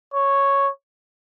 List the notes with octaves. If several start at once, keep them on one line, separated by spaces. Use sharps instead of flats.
C#5